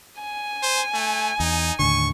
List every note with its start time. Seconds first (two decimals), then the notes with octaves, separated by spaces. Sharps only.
0.21 G#5
0.62 C5
0.94 A3
1.40 E2 D#4
1.79 D#2 A2 D3 C#6